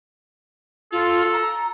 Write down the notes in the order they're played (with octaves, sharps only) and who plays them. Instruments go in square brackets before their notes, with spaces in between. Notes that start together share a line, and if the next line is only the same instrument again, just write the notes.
[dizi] F4 [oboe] A4
[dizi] A#5